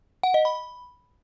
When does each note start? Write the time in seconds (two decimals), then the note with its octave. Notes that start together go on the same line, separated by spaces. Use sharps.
0.23 F#5
0.34 D#5
0.45 B5